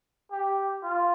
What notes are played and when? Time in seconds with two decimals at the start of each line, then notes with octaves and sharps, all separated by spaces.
0.32 G4
0.83 F4